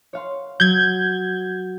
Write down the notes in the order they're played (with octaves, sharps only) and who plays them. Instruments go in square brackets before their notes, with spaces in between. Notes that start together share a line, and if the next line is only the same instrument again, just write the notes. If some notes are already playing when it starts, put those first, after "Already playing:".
[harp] C#5 F5 C6
[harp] F#3 [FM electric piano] G6 G#6